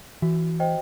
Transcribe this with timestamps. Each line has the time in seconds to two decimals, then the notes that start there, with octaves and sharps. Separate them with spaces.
0.22 E3 F#4
0.60 C5 D#5 G5